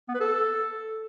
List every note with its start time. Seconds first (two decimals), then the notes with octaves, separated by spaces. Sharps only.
0.09 B3
0.14 B4
0.20 A4